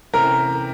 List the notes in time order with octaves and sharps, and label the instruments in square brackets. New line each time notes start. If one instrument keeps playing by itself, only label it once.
[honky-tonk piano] C3 E3 A3 C#4 [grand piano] A#4